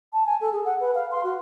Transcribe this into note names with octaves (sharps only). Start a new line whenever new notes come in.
A5
G#5
A4
G#4
F#5
B4
F5
C6
F#4